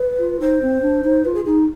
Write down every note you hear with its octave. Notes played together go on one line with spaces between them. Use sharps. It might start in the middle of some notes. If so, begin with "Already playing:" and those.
Already playing: B4
F4
D#4 C5
C4
D4
D#4
F4 B4
G#4
D#4 G#4